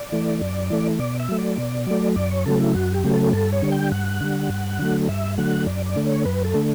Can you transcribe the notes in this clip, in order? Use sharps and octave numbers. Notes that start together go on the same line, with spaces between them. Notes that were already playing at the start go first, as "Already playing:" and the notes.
Already playing: D5
E3 A3
F#2
E3 A3
B2 D5
E5
F#3 A3
D5
B2
F#3 A3
F#2 D5
C#5
C#3 F#3 A3 A4
E4
F#2 F#4
G4
C#3 F#3 A3
A4
G2 A4
C#5
D3 G3
G5
G2 F#5
D3 G3
G2
D3 F#3 A3
G2 E5
D3 F#3 A3 F#5
F#2 D5
D5
D3 A3
C#5
F#2 B4
A4
D3 A3